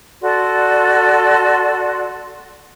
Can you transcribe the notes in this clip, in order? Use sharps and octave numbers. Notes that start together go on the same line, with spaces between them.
F#4 A4 D5 C6